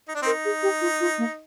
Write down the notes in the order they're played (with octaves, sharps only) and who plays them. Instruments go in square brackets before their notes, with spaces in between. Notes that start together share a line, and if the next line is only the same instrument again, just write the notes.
[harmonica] D#4
D4
[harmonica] C4 D#4 [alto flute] A#4
[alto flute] G#4
G4
F4
F4
A#3